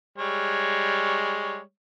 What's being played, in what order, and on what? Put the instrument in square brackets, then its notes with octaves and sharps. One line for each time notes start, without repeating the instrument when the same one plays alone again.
[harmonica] G3 G#3 C#5